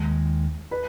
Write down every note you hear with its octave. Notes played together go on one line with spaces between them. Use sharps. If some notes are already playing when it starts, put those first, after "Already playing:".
Already playing: D#2 D#3 G#3
B4